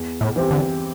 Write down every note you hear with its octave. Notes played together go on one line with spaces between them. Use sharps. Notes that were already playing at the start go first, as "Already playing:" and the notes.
Already playing: E2
A2
E3 C4 G4
D3